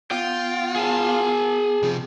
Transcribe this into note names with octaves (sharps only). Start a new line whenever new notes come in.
B3 F4 G5
G#4 A5
C3 F3